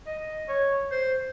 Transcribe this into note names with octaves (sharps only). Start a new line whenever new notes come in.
D#5
C#5
C5